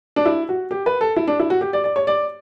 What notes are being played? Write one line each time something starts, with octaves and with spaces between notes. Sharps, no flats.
D4
E4
F#4
G4
B4
A4
E4
D4
E4
F#4
G4
D5
D5
C#5
D5